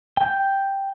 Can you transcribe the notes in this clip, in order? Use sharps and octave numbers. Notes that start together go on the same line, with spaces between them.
G5 G6